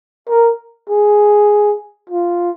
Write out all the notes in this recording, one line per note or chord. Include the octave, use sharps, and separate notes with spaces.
A#4
G#4
F4